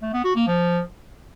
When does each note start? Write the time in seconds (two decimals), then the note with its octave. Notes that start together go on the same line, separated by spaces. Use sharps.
0.02 A3
0.13 B3
0.24 F#4
0.36 A#3
0.47 F3